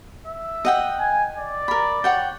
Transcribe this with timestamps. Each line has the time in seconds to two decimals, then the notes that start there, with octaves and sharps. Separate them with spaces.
0.27 E5
0.65 D#5 F#5 G5
1.00 G#5
1.36 D5
1.68 A#4 B5
2.04 C#5 F#5 G5